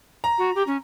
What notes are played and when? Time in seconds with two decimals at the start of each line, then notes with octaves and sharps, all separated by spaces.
0.24 A#5
0.38 F#4
0.55 G4
0.67 C#4